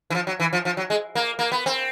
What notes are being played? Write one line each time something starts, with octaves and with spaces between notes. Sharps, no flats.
E3
F3
F#3
E3
F3
F3
F#3
G#3
A#3
A#3
B3
C4